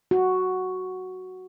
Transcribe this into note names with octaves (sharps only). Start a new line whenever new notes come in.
F#4